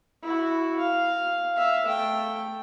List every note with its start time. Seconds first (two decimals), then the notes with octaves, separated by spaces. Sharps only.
0.23 E4 F#4
0.79 F5
1.55 E5 F5
1.87 A3 G5